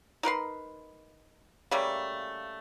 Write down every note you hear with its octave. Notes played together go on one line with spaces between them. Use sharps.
D#4 A#4 B4 C6
C#3 G3 A3 A#3